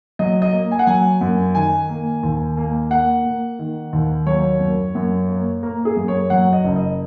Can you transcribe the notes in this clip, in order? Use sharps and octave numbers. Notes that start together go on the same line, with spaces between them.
F#3 D#5
D#5
A#3
G#5
F#5
F#3 G#5
F#2
D#3 G#5
A#3
D#2
A#3
A#3 F#5
A#3
D#3
D#2
F#3 C#5
F#2
F#2
A#3
A#3 A#4
G#4
F#2
C#5
F#3 F#5
D#5
F#1
D#5